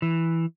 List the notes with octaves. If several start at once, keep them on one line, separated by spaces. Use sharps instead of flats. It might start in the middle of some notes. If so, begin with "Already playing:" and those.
E3